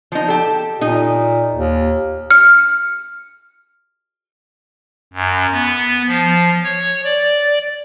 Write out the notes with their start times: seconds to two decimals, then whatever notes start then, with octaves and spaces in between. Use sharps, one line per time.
0.12 F3 D#4
0.28 G4 A4
0.81 A#2 D#4
1.55 D#2
2.31 F6 C#7
5.13 F#2
5.52 B3
6.07 F3
6.64 C#5
7.04 D5